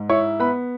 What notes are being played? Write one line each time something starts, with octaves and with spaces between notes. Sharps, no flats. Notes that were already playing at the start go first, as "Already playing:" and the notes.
Already playing: G#2
E4 C#5 C#6
B3 B4 B5